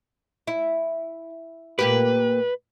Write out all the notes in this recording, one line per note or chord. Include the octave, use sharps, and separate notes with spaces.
E4
A#2 A#3 G4 B4